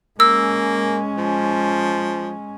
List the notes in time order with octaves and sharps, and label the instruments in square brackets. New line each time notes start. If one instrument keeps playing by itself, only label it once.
[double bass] G#3 C#4 [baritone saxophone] A#3 [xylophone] E6
[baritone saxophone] F3